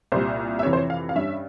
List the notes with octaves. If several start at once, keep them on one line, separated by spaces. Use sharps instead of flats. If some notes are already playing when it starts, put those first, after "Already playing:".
C2 A#2 G3 C5
E5
F2 C3 E3 C#5
C5
C#5
F5
F5
G2 G3 C#4 E5